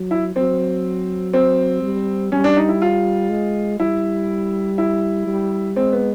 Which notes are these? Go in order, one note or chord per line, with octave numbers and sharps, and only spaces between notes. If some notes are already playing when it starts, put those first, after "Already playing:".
Already playing: F#3
E4
F#3 C4
C4
G3
G3 C#4
D4
D#4
E4
F4
G#3
G3 E4
E4
G3
G#3 C4
B3